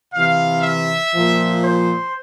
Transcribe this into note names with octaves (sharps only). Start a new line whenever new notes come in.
C3 E3 F5
E5
A#2 F3
C5